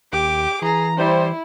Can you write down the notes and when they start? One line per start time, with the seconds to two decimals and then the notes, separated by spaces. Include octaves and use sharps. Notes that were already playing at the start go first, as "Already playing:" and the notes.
0.13 D#2 G4 D6
0.62 E3 G#4 A#5
0.98 G3 E4 C5